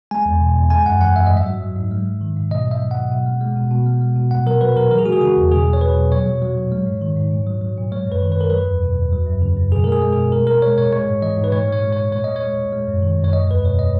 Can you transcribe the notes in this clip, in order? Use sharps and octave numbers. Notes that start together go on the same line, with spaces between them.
G#3 G#5
E2
B2
E2
G#3 G#5
F#2 F#5
E3 F#5
F#2 E5
G#2 D#5
E5
F#3
F#3
G#2
G#3
G#2
D#3
G#2
B2 D#5
F#3
E5
F#3
F#5
B2
B2
G#3
G#3
B2
B2
G#3
G#3
B2
A#2 F#5
F#3 A#4
F#3 B4
A#2 A#4
E3 A#4
G#4
G#3 F#4
G#4
C#3 F#4
E2
B2 G#4
F#3
C#5
F#3 B4
B2
A#2 C#5
F#3
F#3
A#2
G#3
G#2
D#3
G#2
A#2
F#3
F#3
A#2
G#3 C#5
F#2
B4
D#3
B4
F#2 A#4
F#3 B4
E2
B2
E2
F#3
F#2
C#3
F#2
B2 G#4
G#3 A#4
G#4
G#3
B2 G#4
A#2 A#4
G#3 A#4
G#3 C#5
A#2 C#5
G#3 C#5
G#2
E3 D#5
G#2
B4
A#2 C#5
G#3 C#5
G#3
A#2 C#5
A#2 C#5
G#3 D#5
C#5
G#3
A#2
G#3
F#2
D#3
F#2
C#5
G#3 D#5
E2 B4
B2 C#5
D#5